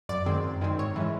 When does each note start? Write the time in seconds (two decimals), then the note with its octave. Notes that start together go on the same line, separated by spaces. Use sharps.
0.09 F#2 D5
0.26 D#3 G#3 C4
0.44 F#2
0.61 D#3 G#3 C4
0.79 G#2 C#5
0.96 E3 G#3 C#4